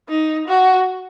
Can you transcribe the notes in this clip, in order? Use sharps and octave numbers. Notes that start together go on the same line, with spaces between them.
D#4
F#4